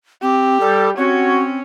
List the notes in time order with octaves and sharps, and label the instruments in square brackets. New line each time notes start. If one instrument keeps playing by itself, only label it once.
[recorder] C4 [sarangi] G4
[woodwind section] G3 [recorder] A4
[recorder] C4 [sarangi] C#4 [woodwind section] F#4 C#5